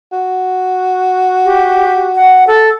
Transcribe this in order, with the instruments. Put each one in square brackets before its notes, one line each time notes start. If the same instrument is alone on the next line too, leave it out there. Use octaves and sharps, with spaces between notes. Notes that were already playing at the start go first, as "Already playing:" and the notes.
[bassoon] F#4
[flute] G4
F#5
A4